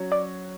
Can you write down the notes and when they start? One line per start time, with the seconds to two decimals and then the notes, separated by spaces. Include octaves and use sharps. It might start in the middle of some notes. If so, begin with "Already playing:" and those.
Already playing: F#3 C#4 F#4 C#5
0.12 D5 D6